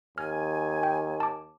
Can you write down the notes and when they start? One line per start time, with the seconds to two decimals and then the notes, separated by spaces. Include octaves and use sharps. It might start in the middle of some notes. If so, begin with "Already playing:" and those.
0.18 D#2 G#5 F6
0.83 G5
1.20 A5 D6